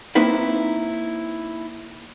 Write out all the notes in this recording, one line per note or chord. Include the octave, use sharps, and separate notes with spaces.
A#3 C4 D#4 E4 B4 C5